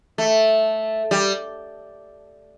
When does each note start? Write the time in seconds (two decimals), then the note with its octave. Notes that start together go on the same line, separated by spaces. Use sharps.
0.18 A3
1.11 G3